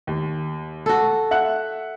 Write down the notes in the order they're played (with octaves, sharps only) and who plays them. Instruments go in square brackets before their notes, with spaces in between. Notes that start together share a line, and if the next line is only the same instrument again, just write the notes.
[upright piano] D#2
[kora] F#4 A4
[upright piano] E5 F#5 F#6